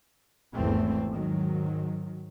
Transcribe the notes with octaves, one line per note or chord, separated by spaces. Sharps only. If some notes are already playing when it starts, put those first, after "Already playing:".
G#1 E2 E3 A3 C4
G#2 D#3 F#3